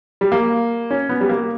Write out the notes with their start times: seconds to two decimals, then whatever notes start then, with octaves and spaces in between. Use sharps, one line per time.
0.21 G3
0.32 A#3
0.91 C#4
1.09 B3
1.21 G3
1.29 A#3